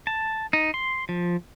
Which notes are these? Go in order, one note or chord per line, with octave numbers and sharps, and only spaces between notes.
A5
D#4
C6
F3